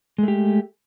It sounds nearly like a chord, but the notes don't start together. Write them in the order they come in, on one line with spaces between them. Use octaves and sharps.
G#3 A3 G4